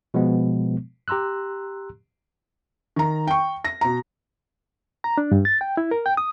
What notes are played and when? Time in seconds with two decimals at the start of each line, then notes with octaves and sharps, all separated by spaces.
0.14 B2 F3 G#3 B3
1.08 G4 A#5 C6 E6 F#6
2.96 D#3 A#5
3.27 G5 C#6
3.65 A#6
3.81 B2 A#5
5.04 A#5
5.18 D4
5.32 G2
5.45 A6
5.61 G5
5.77 E4
5.91 A#4
6.06 G5
6.17 D#6